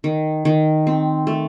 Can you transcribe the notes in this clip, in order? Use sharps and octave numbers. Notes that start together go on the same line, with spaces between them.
D#3
D#3
C4
A3